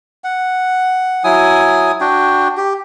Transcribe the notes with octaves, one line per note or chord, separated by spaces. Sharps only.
F#5
F#3 E4 G#5 D#6
D4 F#4 G5
G4